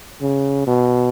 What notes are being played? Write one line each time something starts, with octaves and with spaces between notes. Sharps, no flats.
C#3
B2